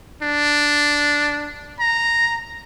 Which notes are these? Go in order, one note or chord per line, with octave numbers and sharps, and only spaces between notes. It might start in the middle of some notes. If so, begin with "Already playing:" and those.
D4
A#5